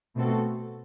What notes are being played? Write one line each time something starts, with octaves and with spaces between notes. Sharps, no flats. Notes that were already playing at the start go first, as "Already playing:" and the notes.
B2 A3 C4 F#4 A4